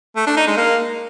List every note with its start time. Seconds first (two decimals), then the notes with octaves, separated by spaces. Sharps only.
0.17 A3
0.27 D4
0.37 D#4
0.47 G#3
0.57 A#3